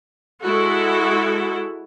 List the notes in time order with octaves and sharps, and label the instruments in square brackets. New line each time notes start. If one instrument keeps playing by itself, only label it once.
[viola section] G#3 E4 F#4 A4